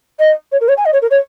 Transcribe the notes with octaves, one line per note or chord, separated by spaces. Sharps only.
D#5
C#5
A#4
C#5
G#5
D#5
C#5
A#4
C#5